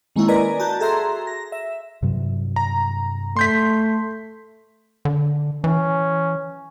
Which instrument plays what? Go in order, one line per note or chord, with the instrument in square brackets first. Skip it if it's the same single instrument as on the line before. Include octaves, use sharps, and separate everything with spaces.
[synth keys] D#3 G#3 A#3 C4 C#4 E4
A#4 B4 D5 D#5 G#5 A#5
F#4 A5 A#5 G6
F#4 G#4 A4 E5 A#5 C6
A#6
E5
[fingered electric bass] G2 C3 F#3
[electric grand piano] A#5
[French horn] A3 [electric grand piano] C6 G6 B6
[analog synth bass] D3
[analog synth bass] E3 [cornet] C#4